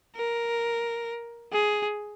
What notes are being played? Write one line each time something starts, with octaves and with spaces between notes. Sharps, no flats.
A#4
G#4